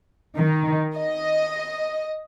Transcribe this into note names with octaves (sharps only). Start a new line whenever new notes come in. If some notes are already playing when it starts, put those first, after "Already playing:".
D#3
D#5